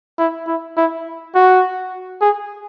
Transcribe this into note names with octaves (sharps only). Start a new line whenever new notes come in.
E4
E4
E4
F#4
G#4